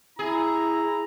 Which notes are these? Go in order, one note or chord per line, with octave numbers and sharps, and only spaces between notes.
E4 G#4 A#5